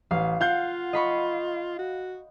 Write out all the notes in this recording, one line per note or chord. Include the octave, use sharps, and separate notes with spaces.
A1 F5
F4 F5 F#5 G6
D#5 B5 C#6
F#4